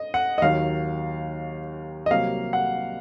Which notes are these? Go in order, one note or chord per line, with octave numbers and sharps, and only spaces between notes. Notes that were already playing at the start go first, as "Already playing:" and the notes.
Already playing: D#5
F#5
D#5
D#2 D#3 F#3 A#3 F5
D#5
C2 C3 F#3 A#3 F5
F#5